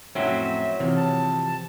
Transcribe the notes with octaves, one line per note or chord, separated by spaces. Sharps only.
F2 A2 F#3 C4 C#4 E5
C3 E3 F3
A5